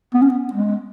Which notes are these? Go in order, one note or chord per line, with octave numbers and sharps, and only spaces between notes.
B3
C#4
B3
G#3